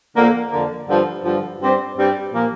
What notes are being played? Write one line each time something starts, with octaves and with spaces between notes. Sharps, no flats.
F2 D3 A#3
F2 D3 A#3
G2 D3 F3
G2 D3 F3
G2 G3 C4 G4 D5
G2 G3 C4 G4 D5
A#2 F3 A#3